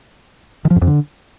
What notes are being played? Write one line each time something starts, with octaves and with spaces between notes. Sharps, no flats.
D#3
F3
F#2
F2
D3